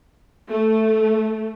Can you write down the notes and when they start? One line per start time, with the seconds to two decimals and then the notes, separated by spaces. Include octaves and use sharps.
0.50 A3